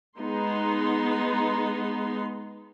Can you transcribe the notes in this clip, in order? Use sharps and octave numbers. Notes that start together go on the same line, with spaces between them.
G#3 B3 D#4 C6